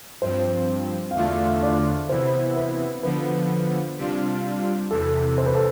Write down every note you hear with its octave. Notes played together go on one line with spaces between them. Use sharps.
G2 F3 C4 C5
F5
E2 D3 A3 D4 F4 E5
D5
C3 E3 B3 E4 C5
B4
D3 F3 B3 B4
C3 G3 D4 F4
E2 C3 E3 A4
C5
B4
A4